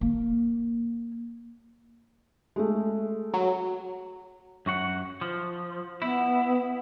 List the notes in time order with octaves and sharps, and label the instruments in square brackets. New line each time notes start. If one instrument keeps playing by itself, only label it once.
[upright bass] A#3
[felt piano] G#3 A3
[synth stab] F#3
[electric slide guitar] F#2 F#4 F#5
F3
[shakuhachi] B3 [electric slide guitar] E4